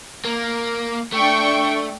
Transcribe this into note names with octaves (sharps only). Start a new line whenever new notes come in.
A#3
A3 D4 G5 C#6